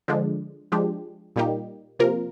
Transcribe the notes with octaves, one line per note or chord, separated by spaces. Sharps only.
D3 F3 G#3 D4
F3 G#3 D4 G4
A#2 G3 A#3 D#4 G4
C3 F3 A#3 F4 A#4